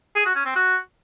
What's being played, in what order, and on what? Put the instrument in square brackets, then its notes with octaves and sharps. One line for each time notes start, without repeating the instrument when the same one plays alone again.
[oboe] G#4
F#4
C#4
C4
F#4